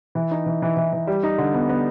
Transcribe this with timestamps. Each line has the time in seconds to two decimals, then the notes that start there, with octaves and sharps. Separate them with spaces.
0.15 E3
0.31 D#4
0.46 E3
0.62 E3
0.77 E3
0.93 E3
1.07 G3
1.23 D#4
1.38 D3
1.54 B3
1.69 B3